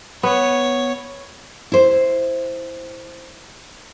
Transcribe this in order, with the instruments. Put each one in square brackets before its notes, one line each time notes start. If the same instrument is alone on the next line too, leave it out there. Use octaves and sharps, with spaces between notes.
[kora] B3 [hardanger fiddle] C#5
[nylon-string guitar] E4 C5